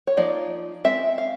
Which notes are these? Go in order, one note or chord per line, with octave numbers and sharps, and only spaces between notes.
C#5
F3 A#3 D#4 D5
G#3 C4 E5
F5